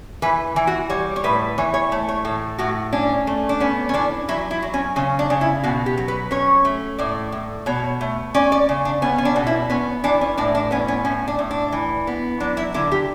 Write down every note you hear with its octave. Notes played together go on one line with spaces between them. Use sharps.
E3 B4
E3
F#4
G3 C#5
C#5
A2 B4
E3 C#5
C#5
A3
C#5
A2 A4
A2 F#4
C#4 D4
A3
D4
B3 C#4
C#4
E3 D4
F#3 E4
E4
F#3
C#4
C#3 C#4
D4
C#3
E4
B2 F#4
G4
F#3
B4
C#4 C#5
A3
A2 D5
A2
B2 C#5
A3
C#4 D5
D5
C#3
D4
B3 C#4
C#4
D4
B2
E4
B3 C#4
E3 D4
C#4
A2 D4
D4
B3 C#4
C#4
A2 C#4
D4
A2
D4
E3
B3
F#3 D4
E4
D3 E4
G4